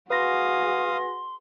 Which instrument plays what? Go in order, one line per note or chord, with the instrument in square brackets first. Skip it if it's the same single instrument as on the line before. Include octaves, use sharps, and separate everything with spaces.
[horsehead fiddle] F#4 G#4 [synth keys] B4 A#6 [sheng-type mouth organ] F5 D#6 [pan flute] C6